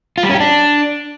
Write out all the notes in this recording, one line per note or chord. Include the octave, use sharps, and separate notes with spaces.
F4
G3
C#4
G4
D4